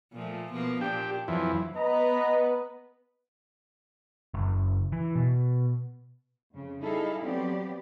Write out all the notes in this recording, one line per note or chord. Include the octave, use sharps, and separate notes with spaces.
A#2 F3 A3
B2 F3 A#3
A#2 D4 G4
F2 E3 F#3
B3 B4 D#5 A#5
F#1
E3
B2
F2 C#3
G3 D#4 E4 G#4 A4 F5
F3 F#3 B3 C4 G4 D5